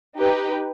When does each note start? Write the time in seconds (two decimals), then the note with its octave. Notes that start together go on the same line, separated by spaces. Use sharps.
0.18 D#4 G4 B4